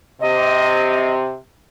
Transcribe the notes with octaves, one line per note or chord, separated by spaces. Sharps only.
C3 D#5